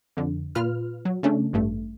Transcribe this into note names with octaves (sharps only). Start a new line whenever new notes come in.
F2 D3
A#2 F4 B4 F6
F#3
C#3 A3 C#4 D4
A1 G2 A3